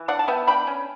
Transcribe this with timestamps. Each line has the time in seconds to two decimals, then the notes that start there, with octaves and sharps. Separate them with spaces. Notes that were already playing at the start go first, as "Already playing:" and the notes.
Already playing: E3
0.08 D4 D5 F#5
0.19 A5
0.28 B3 E5 G5
0.47 D4 G5 B5
0.67 C#4